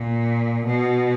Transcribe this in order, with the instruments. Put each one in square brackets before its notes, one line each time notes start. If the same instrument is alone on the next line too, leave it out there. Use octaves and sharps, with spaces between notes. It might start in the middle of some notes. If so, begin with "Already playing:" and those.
Already playing: [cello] A#2
B2